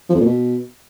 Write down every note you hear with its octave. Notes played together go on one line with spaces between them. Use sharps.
F3
F2
A#2
B2